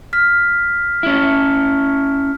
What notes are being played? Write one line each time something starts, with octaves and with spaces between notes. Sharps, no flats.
F6 B6
C#4 E4